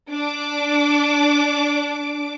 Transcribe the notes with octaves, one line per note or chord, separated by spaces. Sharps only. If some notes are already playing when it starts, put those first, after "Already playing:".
D4 D6